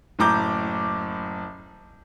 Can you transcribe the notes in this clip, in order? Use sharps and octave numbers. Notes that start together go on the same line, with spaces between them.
F#1 A2 A#5 D6 G6